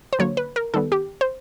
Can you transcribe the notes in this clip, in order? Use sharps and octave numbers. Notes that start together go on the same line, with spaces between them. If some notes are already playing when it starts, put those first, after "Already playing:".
C5
D3 F#3 A#3 C#5
B4
A#4
D#3 G3 B3 A4
G4
C5